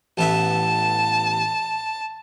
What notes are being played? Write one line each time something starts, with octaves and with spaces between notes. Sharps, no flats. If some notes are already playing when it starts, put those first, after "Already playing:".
A1 B3 E5 A5